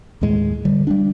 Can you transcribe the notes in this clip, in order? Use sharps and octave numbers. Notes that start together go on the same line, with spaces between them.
D#2 A2 G#3
D3 G3
G3 A3 D4